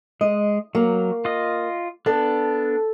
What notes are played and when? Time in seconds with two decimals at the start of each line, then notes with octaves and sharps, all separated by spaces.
0.21 G#3 D#5
0.75 F#3 A#3
1.25 F4 D#5
2.06 B3 D4 A4